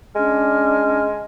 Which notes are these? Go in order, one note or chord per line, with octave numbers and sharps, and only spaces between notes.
G#3 C#4 D4 F6